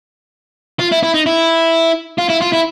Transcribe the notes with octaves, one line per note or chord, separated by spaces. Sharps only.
F4
E4
E4
D#4
E4
F4
E4
F4
E4